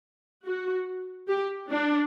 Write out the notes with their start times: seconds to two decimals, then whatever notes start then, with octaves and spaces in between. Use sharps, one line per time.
0.46 F#4
1.28 G4
1.70 D4